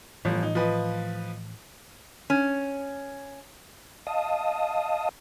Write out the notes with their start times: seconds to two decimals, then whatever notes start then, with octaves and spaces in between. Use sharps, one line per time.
0.25 G1 A2 E3 F3
0.43 D#4
0.55 F3 B4 D#5
2.30 C#4
4.07 D#5 F5 A5 D#6